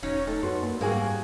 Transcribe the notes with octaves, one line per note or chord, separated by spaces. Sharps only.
E1 F#3 C#4 D#4 C#5
A3 D#4 A4
F#2 B3 F#4 C6
A#3
G#2 G3 A#3 C4 F#4 G#4 G#5